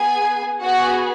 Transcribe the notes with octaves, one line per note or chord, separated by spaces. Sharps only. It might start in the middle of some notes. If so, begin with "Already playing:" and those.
Already playing: B3 G#4 G#5
B3 F#4 G#4 F#5